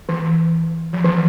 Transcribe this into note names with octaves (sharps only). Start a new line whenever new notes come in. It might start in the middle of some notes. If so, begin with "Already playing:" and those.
E3
F3
E3